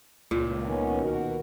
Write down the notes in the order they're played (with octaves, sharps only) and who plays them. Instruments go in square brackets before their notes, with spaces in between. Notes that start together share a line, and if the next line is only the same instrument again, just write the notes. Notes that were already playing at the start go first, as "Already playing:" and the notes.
[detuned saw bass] C#2 [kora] A#2
[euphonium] D#3 [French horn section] B3 C#4
[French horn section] B2 F#4 A#4